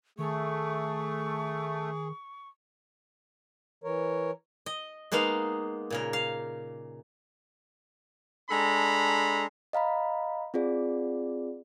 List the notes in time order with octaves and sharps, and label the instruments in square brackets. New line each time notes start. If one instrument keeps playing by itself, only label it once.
[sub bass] D#3 [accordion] A3 [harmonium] G#4 [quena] C#6
[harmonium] E3 A#4 C#5
[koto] D#5
G#3 A#3 B3 D#4 F5
A#2 C#3 A#4
F5
[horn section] G#3 D4 A4 A#5 B5
[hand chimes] D#5 F5 A#5 B5
C4 F4 G#4 D5